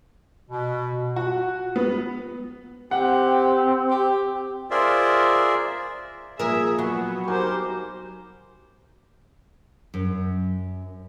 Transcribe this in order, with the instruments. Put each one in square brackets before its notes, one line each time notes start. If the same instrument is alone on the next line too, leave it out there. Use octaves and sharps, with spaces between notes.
[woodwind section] B2
[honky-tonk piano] F#4
B3
[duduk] C4 [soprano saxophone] G4 [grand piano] F#5
[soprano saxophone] G4
[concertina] F4 G#4 A#4 C5 D5 E5
[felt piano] A#2 F3 [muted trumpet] G#4 [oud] A#4 [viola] E5
[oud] F#3 [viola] B3 [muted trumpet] F#4
[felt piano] D#4 F#4 G#5 [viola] G4 C5 [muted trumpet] A#4
[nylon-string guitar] F#2